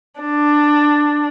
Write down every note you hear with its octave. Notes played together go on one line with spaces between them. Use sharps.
D4